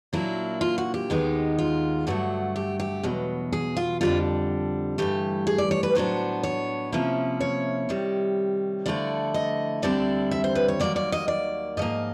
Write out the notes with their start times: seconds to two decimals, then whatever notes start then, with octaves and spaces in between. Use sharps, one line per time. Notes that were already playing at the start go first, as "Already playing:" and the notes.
0.13 A#2 F#3 A#3 D4 E4
0.61 F4
0.78 F#4
0.94 G4
1.10 D#2 D#3 G#3 B3 D#4
1.59 F4
2.07 G2 D3 F#3 A3 F#4
2.56 G4
2.80 G4
3.03 E2 B2 F#3
3.52 G#4
3.77 F4
4.01 F2 D3 G3 F4
4.98 G2 E3 A3 G4
5.47 G#4
5.58 D5
5.71 C#5
5.83 B4
5.95 A2 F#3 B3 D4 C5
6.43 C#5
6.92 C3 F3 A#3 C#4 E4
7.41 C#5
7.89 C3 D#3 G3
8.86 D3 F3 A3 C#4 E4 D5
9.34 D#5
9.82 D2 D3 G3 C4 E4 D5
10.31 E5
10.44 C5
10.55 B4
10.68 C#5
10.80 D#2 D#3 F#3 A#3 D5
10.96 D5
11.12 D#5
11.28 D5
11.77 G#2 F3 A#3 D#5